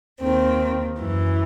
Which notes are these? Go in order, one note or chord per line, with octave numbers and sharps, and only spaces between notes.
D#2 D#3 C4
F#2 E3